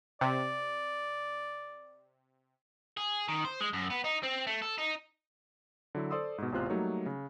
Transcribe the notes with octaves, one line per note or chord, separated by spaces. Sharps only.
C3 D5
G#4
D#3
C5
G#3
F#2
B3
D#4
C4
A3
A4
D#4
D3 F#3 E4
A4 C5 D5 C6 D#6 E6
G#2 B2
A1 E2 C3 F4 C5 F#6
F#3 G3 A3 A#3 D#4 C#5
C#3